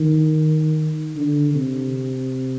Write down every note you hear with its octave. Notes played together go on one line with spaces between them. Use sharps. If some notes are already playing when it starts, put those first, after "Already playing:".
Already playing: D#3
D3
C3